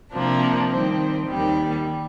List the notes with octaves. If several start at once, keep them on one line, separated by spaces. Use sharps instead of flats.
C3 F3 A#3 D4
D#3 G3 C4
D#2 D#3 G3